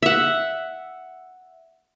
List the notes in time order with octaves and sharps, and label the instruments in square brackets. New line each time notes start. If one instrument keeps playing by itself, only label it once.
[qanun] E5 F#5